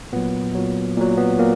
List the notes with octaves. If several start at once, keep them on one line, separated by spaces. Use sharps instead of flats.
A#2 F#3 B3
A#2 F#3
A#2 F#3
B3
A#2 A#3